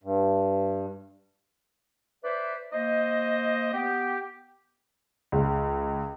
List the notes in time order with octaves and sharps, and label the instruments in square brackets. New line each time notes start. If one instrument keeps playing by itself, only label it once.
[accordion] G2
[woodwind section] B4 C5 D5 E5
A#3 C5 D#5
B3 G4
[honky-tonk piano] C#2